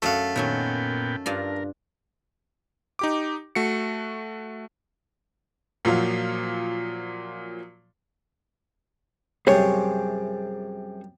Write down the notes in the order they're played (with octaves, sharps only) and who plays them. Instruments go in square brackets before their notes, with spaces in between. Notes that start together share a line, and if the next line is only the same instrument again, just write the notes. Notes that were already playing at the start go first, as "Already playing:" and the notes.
[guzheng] F#2 F#4 F#5 [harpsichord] A3 F5
[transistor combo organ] A#2 B3 G5 [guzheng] D#3 F#3 C#4
[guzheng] G2 D4 F4 [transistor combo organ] A#4
[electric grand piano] D#4 G4 D6
A3 F#4 C#7
[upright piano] A#2 F3 F#3 F5
[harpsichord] F#2 C3 G3 [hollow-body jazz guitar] G#4 C5 C#5